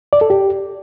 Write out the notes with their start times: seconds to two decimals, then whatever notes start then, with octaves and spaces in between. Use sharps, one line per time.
0.13 D5
0.21 A4
0.30 G4